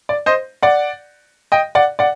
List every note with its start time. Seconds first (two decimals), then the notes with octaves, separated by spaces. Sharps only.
0.09 D5
0.26 C5 D#5
0.63 D5 F#5
1.52 D#5 G5
1.75 D5 F#5
1.99 D5 F#5